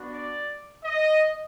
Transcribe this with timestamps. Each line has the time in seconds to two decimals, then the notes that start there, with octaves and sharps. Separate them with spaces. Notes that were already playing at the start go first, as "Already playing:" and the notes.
Already playing: B3 D4 F#4
0.14 D5
0.85 D#5